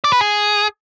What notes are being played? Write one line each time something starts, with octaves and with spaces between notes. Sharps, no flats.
D5
B4
G#4